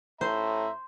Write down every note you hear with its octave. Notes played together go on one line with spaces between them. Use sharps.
A2 C5 E5 A#5